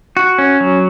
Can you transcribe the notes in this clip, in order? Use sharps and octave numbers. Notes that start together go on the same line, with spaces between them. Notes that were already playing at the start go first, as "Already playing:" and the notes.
F#4
C#4
F#3